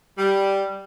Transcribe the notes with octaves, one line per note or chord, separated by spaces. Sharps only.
G3